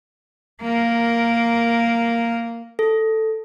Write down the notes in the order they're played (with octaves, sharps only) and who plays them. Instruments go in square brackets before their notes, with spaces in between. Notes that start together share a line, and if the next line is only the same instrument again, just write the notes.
[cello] A#3 A#4
[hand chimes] A4